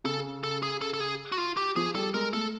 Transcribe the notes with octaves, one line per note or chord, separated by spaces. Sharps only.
C#3 A4
A4
G#4
A4
A4
G#4
F#4
F4
G4
F3 G#4
G3 A4
G#3 A#4
A3 A4